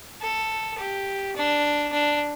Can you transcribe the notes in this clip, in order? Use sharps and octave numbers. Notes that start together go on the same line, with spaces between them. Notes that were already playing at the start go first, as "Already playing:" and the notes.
A4
G4
D4
D4